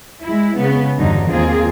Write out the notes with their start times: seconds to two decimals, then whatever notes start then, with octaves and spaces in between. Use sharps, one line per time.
0.23 G#3 E4
0.57 C#3 B3
0.98 E2 G2 D3 F#3 D#4
1.29 D#2 A#3 C4 F4 G#4